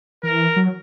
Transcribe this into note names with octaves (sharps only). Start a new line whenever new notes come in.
E3 A#4
F#3